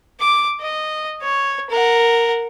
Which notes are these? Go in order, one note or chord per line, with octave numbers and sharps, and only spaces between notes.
D6
D#5
C#5
A#4 F#5